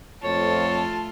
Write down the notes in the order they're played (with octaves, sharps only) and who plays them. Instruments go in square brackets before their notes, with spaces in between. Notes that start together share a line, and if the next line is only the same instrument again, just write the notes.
[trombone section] F2 [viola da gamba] A3 F4 [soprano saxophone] C#5 [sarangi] A5